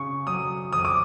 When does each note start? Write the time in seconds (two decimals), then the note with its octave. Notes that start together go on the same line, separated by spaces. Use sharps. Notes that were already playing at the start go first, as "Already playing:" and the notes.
Already playing: C#3 C#6
0.27 F#3 D#6
0.72 F2 D#6
0.85 D6